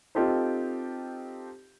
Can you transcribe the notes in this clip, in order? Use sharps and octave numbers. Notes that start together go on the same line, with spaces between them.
C4 D#4 F4 G4 A4 C5